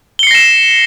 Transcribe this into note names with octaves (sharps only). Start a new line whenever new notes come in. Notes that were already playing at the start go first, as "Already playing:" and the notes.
A#6 C7 C#7 E7 G7